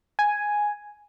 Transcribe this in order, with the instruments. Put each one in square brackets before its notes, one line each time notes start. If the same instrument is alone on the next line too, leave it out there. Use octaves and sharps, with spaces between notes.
[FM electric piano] G#5